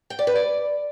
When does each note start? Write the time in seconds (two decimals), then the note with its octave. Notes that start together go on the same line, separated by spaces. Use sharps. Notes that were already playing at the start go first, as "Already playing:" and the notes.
0.10 G5
0.19 D5
0.27 B4
0.35 D5